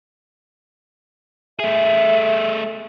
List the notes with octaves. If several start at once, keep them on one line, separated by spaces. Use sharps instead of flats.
A3 G#4 E5